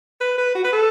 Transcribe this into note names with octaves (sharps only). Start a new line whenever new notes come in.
B4
B4
F#4
B4
A4